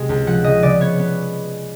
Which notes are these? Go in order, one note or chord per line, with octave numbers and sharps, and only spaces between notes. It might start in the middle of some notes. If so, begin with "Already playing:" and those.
Already playing: C3 G#3
C#2
F3 F#5
C#3 D#5
C#3 D5
B3 C#5
B3